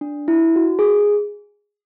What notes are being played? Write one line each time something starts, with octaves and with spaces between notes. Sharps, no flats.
D4
E4
F#4
G#4